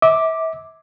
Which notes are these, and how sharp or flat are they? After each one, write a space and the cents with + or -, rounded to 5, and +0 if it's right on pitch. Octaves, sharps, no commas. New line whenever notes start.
E5 -30 D6 +0